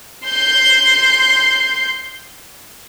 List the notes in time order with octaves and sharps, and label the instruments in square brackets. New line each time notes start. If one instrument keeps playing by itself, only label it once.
[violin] C6 G6